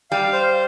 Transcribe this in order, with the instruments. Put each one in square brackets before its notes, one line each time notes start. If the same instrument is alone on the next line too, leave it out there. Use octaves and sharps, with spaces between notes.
[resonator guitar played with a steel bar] G3 [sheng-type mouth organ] F5
[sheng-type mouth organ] C5